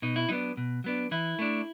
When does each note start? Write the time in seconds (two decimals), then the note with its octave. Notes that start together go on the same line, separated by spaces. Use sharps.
0.02 B2 D#4
0.16 E4
0.29 F#3 B3 D4 D#4
0.57 B2
0.84 F#3 B3 D4
1.11 E3 E4
1.39 A3 D4